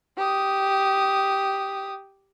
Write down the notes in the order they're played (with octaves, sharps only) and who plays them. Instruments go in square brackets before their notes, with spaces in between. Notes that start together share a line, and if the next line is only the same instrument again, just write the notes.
[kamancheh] G4 D#6